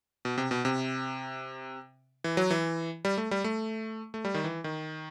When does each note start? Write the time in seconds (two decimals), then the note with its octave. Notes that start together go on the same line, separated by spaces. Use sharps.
0.25 B2
0.38 C3
0.51 B2
0.65 C3
2.24 E3
2.37 F#3
2.50 E3
3.05 G3
3.18 A3
3.31 G3
3.44 A3
4.14 A3
4.25 G3
4.34 D#3
4.44 E3
4.64 D#3